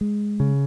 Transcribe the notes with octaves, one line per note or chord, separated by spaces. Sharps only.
G#3
C#3